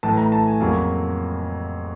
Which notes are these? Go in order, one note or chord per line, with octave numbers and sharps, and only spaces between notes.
A2 E3 A3 A5
A#5
A5
G#5
F2 C#3 F#3 A#3